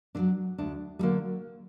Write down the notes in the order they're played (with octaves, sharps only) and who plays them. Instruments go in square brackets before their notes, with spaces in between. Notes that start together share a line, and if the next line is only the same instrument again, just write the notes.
[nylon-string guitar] D3 D4
F#3
D2 D4
G3
D3 F#3 A#3